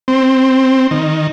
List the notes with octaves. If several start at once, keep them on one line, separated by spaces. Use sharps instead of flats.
C4
D#3